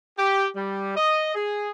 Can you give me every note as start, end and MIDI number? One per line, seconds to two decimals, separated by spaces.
0.18 0.47 67
0.55 0.92 55
0.96 1.34 75
1.35 1.71 68